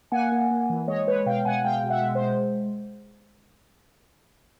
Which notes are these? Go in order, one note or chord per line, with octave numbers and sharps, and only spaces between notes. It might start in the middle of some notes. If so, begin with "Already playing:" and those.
A#3 F#5 G#5
A#3
A#3
E3
G#3 C#5 D#5
G#3 B4 C#5
B2 F5 G5
B2 F#5 G#5
G#3 F5 G5
B2
E5 F#5
G#3
C5
G#3